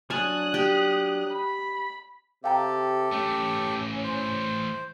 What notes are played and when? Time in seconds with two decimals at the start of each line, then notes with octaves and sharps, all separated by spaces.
0.10 F#3 D4 C#5 G#5 A5 D#6 F#6
0.54 G4
1.32 B5
2.44 C3 G4 A4 F5 G5 A#5
3.12 E3 A3 C#4
4.04 C5